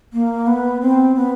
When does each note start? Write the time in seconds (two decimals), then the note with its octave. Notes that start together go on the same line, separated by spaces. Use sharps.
0.13 A#3
0.47 B3
0.81 C4
1.15 B3